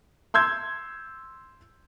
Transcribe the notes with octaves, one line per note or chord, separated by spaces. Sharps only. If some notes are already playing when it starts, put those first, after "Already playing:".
C6 E6 G6 G#6